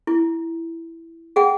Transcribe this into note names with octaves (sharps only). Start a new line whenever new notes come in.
E4
G#4 F#5 G5